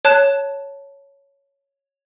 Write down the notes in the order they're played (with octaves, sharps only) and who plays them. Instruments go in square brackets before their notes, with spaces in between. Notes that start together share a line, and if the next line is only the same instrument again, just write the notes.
[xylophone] C#5 A5 F#6 E7